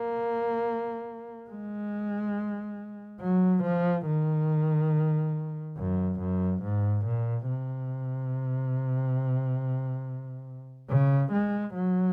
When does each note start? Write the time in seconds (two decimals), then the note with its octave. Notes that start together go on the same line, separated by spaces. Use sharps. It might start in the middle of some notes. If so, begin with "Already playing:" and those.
Already playing: A#3
1.50 G#3
3.21 F#3
3.63 F3
4.06 D#3
5.77 F#2
6.20 F#2
6.63 G#2
7.05 A#2
7.48 C3
10.89 C#3
11.32 G#3
11.74 F#3